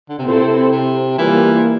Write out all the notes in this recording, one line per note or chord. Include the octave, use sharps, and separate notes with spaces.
D3
C3
A#2 C4 E4 A4 C5
C3
C3
E3 G3 A#3 F4